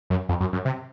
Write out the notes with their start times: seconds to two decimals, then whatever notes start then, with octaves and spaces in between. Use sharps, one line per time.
0.10 F#2
0.29 F2
0.40 F#2
0.53 F#2
0.65 C3